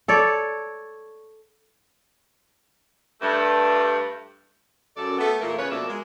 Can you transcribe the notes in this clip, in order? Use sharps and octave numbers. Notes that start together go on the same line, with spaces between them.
A4 C#5 D5
G2 A3
F#2 A4 D5
A3 B3 A4
E2 A#2 A3 A#3
C#3 C#4 B4 C#5
B2 F3 A3 A#3 D5 E5
G#3 A#4